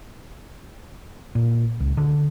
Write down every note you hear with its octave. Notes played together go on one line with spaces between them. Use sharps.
A#2
C#2
D3